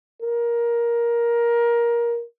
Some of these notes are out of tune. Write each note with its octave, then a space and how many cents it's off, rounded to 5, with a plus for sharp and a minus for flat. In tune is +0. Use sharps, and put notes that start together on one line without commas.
A#4 +15